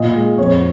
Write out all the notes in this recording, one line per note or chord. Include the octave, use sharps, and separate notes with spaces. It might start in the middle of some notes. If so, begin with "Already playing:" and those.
Already playing: A#2 D#5
G#3
F2 C#5